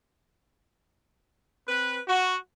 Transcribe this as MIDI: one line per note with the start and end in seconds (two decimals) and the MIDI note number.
1.67 2.00 60
1.67 2.00 71
2.07 2.37 66